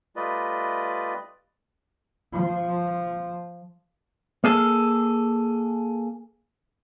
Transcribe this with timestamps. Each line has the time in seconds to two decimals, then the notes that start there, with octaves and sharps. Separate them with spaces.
0.16 G3 A3 F4 B4 D5 D#5
2.33 F3
4.44 A#3 G#4 A4